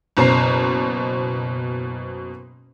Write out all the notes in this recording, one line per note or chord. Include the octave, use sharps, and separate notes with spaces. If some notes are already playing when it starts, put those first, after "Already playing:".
F#1 B2 C5 A#5 C7